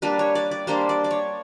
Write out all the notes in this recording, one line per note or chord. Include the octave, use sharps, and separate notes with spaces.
G3 A#3 D4 B4
C#5
D5
D5
G3 A#3 D4 C5
D5
D5
C#5